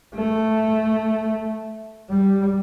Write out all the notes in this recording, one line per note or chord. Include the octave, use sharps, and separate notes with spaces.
A3
G3